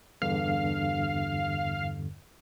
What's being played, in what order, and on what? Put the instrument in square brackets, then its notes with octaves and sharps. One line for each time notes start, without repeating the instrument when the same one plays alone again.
[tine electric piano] E2 G2 D3 [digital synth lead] F5